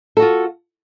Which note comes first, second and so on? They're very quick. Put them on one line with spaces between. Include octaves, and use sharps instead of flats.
A4 F#4 F4